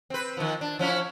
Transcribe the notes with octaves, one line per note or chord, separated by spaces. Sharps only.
C4 B4
D#3 F3
D4
F3 C#4 E4